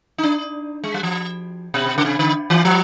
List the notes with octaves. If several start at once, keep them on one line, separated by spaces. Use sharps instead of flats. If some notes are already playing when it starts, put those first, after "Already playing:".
D#4
D4
G#3
G3
F3
B2
C#3
C3
D3
E3
F3